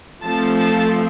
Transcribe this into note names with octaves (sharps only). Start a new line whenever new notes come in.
F3 A3 C4 A5
A5